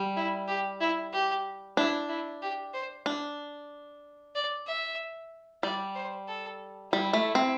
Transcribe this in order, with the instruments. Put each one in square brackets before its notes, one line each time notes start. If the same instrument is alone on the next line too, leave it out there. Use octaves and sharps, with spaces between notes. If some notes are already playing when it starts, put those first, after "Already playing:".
Already playing: [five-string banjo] G3
[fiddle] E4
G4
E4
G4
[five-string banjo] D4 [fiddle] E4
[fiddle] E4
G4
C5
[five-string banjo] D4
[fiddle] D5
E5
[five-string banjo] G3 [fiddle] D5
[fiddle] C5
A4
[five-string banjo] G3 [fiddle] E4
[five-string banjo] A3
C4